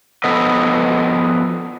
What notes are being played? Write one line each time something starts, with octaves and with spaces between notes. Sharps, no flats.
F3 B3 A4 B4 D#5